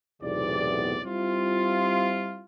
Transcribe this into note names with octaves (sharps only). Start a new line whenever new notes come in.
B1 E2 A2 C3 B3 D5
G3 C4 E4 F4